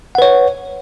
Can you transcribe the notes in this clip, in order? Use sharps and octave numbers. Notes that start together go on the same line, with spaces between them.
B4 C#5 F#5